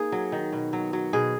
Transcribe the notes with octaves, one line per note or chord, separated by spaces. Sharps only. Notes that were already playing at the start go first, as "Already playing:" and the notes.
Already playing: A#3 D#4 G#4
F#3
D#3
B2
F#3
F#3
B2 G#4